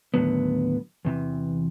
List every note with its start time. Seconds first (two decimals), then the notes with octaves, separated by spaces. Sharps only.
0.14 D#2 A2 D3 F#3 B3
1.05 E2 C3 E3